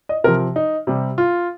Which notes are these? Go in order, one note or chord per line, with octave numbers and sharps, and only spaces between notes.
D#5
C3 F3 A#4
D#4
C3 G3
F4